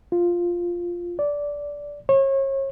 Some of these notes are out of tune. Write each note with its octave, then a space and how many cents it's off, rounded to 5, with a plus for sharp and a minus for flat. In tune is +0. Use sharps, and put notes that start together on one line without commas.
F4 +0
D5 -15
C#5 -35